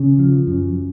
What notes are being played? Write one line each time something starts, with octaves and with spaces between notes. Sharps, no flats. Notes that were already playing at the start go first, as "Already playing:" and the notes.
Already playing: C#3
F3
F#2